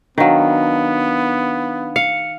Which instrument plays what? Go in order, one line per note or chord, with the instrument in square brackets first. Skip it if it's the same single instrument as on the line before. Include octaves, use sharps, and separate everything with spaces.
[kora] D#3 F#3 [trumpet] B3 [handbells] D4 F5
[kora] F5 [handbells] C#7